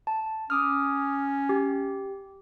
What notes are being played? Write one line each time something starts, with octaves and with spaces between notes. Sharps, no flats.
A5
C#4 D6 D#6 F6
G4